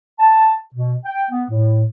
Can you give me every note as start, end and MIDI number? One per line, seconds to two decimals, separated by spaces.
0.19 0.55 81
0.74 0.94 47
1.05 1.25 79
1.31 1.45 59
1.50 1.84 45